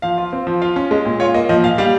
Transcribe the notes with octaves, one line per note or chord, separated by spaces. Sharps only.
F3 F5
F4
C4
F3
F4 F5
C#4
G#3
A#2
F4 C#5
A#3 D#5
F3 D#5
A#2 F5
G3 F5